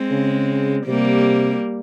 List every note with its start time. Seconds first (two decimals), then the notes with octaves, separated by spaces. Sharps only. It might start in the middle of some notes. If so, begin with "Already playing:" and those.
Already playing: G#3 C4
0.11 C#3
0.86 C3 G3 A#3